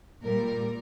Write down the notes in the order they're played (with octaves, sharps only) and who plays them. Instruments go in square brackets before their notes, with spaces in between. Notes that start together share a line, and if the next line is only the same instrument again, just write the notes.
[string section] A#2 G3 A#4